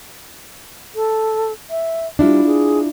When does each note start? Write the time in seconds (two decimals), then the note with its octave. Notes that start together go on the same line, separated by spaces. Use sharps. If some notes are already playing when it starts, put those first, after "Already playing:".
0.95 A4
1.70 E5
2.19 G3 D4 E4 F4
2.46 G#4